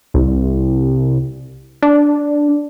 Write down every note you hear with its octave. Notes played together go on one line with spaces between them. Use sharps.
C2
D4